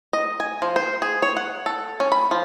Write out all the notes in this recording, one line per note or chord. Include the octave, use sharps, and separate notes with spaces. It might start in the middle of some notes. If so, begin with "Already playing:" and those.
D#5
G#5
F3
C5
G#4
C#5
F#5
A4
C#4
B5
F3